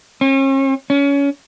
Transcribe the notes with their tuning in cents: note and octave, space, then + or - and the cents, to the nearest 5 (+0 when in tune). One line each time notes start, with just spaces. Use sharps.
C#4 -40
C#4 +25